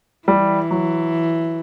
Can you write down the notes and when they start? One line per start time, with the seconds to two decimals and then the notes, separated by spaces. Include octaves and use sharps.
0.28 E3 G3
0.71 F#3